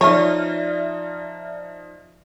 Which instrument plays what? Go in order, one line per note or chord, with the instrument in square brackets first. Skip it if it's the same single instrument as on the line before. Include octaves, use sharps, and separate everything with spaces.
[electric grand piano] F3 D#4 [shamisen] C#5 [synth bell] D5 E5 F6